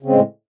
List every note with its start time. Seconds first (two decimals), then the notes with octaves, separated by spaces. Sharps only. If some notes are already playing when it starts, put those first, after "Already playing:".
0.03 C#3
0.06 C4
0.09 G#3
0.12 A2